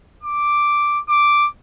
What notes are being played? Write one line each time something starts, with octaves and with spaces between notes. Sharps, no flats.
D6
D6